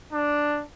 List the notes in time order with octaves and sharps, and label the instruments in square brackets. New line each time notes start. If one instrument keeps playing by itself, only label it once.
[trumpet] D4